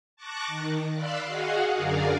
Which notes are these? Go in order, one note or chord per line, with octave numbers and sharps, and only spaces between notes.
A5 C#6 D6 F#6 A#6
D#3
D5 F5 B5 C6 E6 F#6
F#4 G#4 D#5 F5 F#5
F#2 D3 G#4 A#4 D5 F5